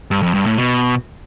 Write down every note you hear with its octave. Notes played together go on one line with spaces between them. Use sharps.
G2
F2
G2
A2
B2